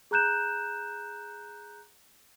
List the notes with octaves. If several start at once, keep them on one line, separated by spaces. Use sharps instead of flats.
G#4 A#5 F#6 G6 E7